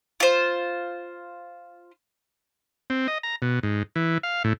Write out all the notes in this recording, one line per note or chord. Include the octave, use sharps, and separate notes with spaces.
F4 C5
C4
D#5
A#5
B2
G#2
E3
F5
A2